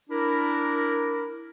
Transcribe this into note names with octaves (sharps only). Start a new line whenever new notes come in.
D4 E4 A#4